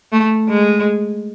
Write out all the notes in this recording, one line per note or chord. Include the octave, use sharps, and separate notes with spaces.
A3
G#3